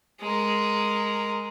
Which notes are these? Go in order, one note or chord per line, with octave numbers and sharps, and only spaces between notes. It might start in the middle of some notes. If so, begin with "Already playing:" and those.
G#3 A#4